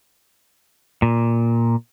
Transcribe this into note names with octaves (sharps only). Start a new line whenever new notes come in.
A#2